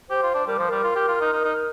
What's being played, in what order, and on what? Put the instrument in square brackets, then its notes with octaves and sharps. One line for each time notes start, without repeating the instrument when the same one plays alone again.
[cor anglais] G4 [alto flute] C5
[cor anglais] F4
D4
[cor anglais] G3 [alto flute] A#4
[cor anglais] F3 [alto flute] C5
[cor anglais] G3 [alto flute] A#4
[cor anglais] F4
G4
F4
D#4
D#4
D#4